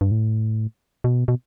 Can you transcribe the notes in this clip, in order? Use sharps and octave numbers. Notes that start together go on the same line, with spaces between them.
G2
A2
B2
B2